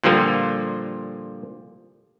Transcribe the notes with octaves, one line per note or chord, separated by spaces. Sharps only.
A#2 D3 F3 G3 A#3